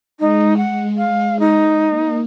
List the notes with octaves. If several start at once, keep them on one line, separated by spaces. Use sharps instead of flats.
G#3 D#4
F#5
F5
D#4
A#3